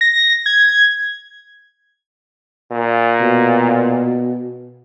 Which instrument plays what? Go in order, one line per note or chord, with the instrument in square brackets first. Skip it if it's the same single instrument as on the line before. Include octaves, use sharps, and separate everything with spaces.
[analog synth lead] A#6
G#6
[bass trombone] A#2
[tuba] B2